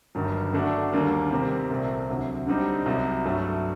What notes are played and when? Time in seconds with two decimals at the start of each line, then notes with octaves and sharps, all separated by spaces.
0.15 G1 G2 D#3 F#3
0.53 D3 A3 D4 F#4
0.93 D#2 D3 G3 A#3
1.31 C3 D#3 G3 C4 G4
1.70 C2 A#2 A3 C4
2.09 D2 C3 F#3
2.47 D3 G3 C4 D#4 G4
2.86 C2 C3 F#3
3.25 G2 F#3 A3